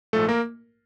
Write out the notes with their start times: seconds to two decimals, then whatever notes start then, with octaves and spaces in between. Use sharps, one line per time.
0.13 A#1 G#2 F3 A3 A4
0.28 A#3 A#4